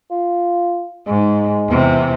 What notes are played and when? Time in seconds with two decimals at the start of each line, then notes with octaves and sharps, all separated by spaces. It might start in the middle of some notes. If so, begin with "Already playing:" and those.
0.11 F4
1.07 G#2 G#3
1.69 E2 C3